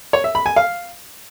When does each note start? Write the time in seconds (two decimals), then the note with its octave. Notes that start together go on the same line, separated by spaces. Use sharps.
0.13 C#5
0.24 E5
0.35 B5
0.46 G#5
0.56 F5